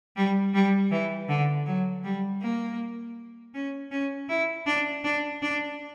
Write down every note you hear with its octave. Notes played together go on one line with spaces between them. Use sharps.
G3
G3
E3
D3
F#3
G3
A#3
C#4
C#4
E4
D4
D4
D4